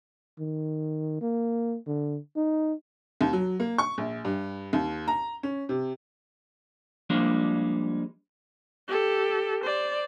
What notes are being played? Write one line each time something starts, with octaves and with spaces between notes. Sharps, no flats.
D#3
A#3
D3
D#4
D#2
F#3
A#3
C#6
A#1
G2
D#2
A#5
C#4
C3
F3 G3 G#3 A#3 D4
G4 A4
C5 D5